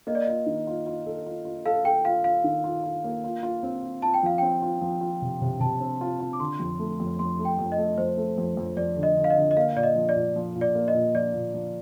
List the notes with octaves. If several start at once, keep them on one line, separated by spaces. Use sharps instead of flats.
A#3 D#5
D5
D#5
F4
D#3
F4
F4
A4
F4
F4
A4 F5
A4 G5
F4 F5
F4 F5
D#3
F4
F4
A#3
F4
F4
C4
F4
F4 A5
G5
F3 F5
C4 G5
F4
F3
F4
C3
C3
C3 A5
C4
F4
F4
D6
D3 C6
F2
A3
F2
F2 C6
A3
G5
F2
D#5
A3
F2 C5
A3
F2
F2
F2 D5
D3
D#5
D3
F5
D#5
D3
D#5
A#3 F5
A#2 D5
D#5
F3
D5
A#2
F3
A#2
D5
A#3
D#5
A#2
F3 D5
A#2
F3